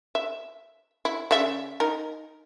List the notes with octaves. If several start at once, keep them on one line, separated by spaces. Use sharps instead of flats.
E5
E4
C#3 D5 E5
D#4 A#4